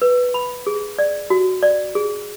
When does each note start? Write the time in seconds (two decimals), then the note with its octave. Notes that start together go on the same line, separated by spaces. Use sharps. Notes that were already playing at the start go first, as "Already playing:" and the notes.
0.02 B4
0.34 B5
0.67 G#4
0.99 D5
1.30 F#4
1.63 D5
1.95 G#4